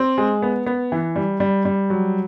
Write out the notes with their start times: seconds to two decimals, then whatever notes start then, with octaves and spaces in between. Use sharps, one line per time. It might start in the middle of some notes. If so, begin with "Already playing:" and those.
Already playing: C4
0.18 G#3
0.42 B3
0.66 B3
0.92 E3
1.16 G3
1.40 G3
1.65 G3
1.90 F#3